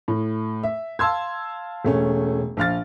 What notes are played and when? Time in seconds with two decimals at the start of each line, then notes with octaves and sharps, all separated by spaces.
0.08 A2
0.63 E5
0.99 F5 A5 C6 E6 G#6
1.85 E1 A3 C#4
2.57 A#1 F5 F6 A6